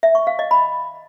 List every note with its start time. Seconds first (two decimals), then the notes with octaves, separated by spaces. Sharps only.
0.03 E5
0.15 C#6
0.27 F5
0.39 D#5
0.51 B5